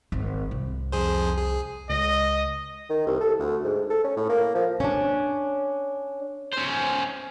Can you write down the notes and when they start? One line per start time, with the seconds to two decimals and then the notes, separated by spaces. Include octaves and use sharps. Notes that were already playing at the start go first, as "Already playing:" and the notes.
0.12 G#1
0.51 C2
0.92 F2 G#4 C5
1.37 G#4
1.90 C#2 D#5 A#6
2.90 D#3
3.07 C2
3.20 A4
3.39 D2
3.65 G#2
3.90 A4
4.04 C#4
4.17 A2
4.29 A#3
4.55 F3
4.80 C#4 D4
6.53 C#4 C5